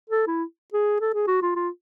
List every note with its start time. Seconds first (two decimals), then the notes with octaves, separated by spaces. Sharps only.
0.10 A4
0.27 E4
0.73 G#4
1.01 A4
1.15 G#4
1.28 F#4
1.42 F4
1.55 F4